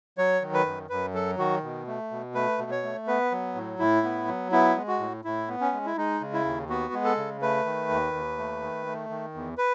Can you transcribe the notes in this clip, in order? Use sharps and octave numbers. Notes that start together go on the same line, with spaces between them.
F#3 C#5
D#3
B4
F#2
F#2 B4
F#3 A4
D#3 F#4
B2
A3
B2
A3 B4
B2
C#5
A3
B3 B4
F#3
A2
A2 E4
B3
F#3
B3 E4
G#3
F#4
A2
A2 E4
B3
C#4
G#3
E4
G#3 D#4
C#3
E4
D#2
B3 F#4
G#3
A4
C#3
A3 B4
D#3
D#2
D#2
A3
D#3
A3
D#3
E2
B4